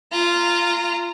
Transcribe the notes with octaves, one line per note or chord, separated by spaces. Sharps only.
F4 A#5